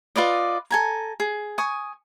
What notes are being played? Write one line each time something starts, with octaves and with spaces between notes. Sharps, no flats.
F4 B4 D5 D#5
A4 G#5 A#5
G#4
G#5 C#6 D#6